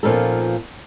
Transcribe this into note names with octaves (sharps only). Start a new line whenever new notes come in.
A#2 F3 B3 C#4 D#4 A4